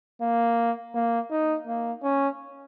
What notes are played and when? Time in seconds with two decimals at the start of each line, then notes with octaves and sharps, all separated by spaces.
0.21 A#3
0.95 A#3
1.30 D#4
1.67 A#3
2.03 C#4